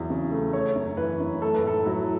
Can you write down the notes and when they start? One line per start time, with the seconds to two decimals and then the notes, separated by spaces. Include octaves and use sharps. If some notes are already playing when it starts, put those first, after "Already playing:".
Already playing: E2 F#3
0.10 C#3
0.32 A3
0.53 A3 C#5
0.75 F#2
0.97 E3 B4
1.20 F#2
1.42 A3 A4
1.55 B4
1.64 A2 A4
1.86 F#3 E4